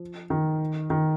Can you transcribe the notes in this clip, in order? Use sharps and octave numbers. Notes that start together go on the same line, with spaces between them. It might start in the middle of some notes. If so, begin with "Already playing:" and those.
Already playing: F3
D#3
D#3